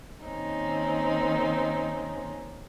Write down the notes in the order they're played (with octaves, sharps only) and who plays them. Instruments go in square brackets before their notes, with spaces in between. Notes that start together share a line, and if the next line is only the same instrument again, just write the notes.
[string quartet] D#3 A#3 C4 C#4 D#4